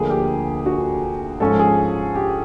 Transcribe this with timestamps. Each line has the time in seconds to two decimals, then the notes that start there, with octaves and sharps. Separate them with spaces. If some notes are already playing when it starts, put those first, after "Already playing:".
Already playing: D2 D3 F3 A#3 G#4
0.10 G4
0.66 F#4
1.40 G#2 F3 G#3 C#4 A4
1.59 G#4
2.15 G4